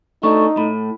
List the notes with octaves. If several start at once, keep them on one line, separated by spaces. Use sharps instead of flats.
A3 D4 D#4 C#6
A2 B5